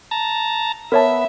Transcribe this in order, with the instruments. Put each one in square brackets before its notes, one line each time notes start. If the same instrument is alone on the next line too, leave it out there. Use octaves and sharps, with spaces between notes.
[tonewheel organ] A5 A#5
[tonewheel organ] B3 [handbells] A#4 C#5 A5 [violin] E5